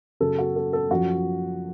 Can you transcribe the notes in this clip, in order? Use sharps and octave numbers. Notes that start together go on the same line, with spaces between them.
F#2 C#3 F#3 A4
F#4
A4
A4
F#2 F3 F#4